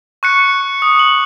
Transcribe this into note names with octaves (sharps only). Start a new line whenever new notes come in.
C#6 F#6 C#7
D#6
F#7